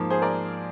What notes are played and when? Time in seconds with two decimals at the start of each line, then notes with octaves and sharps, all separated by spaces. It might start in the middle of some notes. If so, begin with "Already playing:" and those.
Already playing: G#2 F3 A#3
0.10 G#4 C5
0.22 A#4 D5